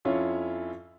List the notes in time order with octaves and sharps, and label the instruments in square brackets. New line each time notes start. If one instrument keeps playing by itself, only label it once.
[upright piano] F2 C#4 E4 F4 C#5